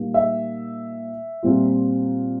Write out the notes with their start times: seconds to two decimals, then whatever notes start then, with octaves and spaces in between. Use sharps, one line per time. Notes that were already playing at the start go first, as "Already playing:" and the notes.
Already playing: A#2 G3 A#3 D#4
0.14 E5
1.43 A#2 G3 C4 F4